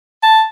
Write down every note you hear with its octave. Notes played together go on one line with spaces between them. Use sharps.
A5